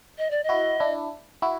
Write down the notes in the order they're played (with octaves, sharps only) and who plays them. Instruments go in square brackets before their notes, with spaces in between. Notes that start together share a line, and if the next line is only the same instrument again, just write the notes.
[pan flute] D#5
D5
D#5
[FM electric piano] E4 F#4
D4 E4
E4 F#4